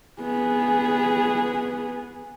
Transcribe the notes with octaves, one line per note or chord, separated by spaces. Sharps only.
B3 G#4